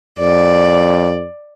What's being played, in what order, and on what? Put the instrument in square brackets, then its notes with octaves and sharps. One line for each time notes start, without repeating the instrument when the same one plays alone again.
[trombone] F2 [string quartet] D5